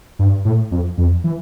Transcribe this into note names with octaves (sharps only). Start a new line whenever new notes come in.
G2
A2
F2
F2
E3